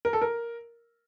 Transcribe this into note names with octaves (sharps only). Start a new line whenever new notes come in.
A#4
A4
A#4